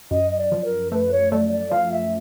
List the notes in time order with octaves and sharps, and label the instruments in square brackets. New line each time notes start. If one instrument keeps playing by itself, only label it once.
[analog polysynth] F#2 [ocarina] D#5
[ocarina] D#5
D5
[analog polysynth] F3
[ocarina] A#4
[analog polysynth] A3 [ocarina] B4
[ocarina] C#5
[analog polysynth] A3 [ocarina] D5
[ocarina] D5
[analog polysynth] F3 [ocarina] F5
[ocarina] E5